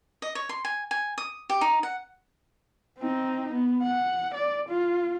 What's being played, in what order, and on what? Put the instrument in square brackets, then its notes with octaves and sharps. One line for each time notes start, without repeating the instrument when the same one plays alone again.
[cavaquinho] D#5
C#5
C6
G#5
G#5
D#6
G4
D#4
F#5
[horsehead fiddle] C4 D#4
B3
F#5
D5
F4